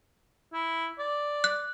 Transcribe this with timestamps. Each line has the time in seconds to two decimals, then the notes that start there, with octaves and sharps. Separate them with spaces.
0.53 E4
0.99 D5
1.44 F#6